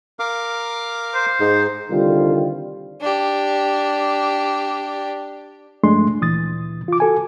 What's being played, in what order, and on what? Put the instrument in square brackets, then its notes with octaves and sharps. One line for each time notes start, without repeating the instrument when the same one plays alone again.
[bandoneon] A#4 F5 D6
[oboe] C5
[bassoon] G#2 [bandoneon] D#4
[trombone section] C2 D3 D#3 G3 F4
[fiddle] D4 G4
[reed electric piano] G2 F3 G#3 A3 D4 C6
D2 A#2 E3 D#6 A6
F4 D6
F#4 A4 G#5